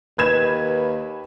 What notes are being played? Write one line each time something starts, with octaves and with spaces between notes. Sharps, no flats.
D#2 B4 G#6 E7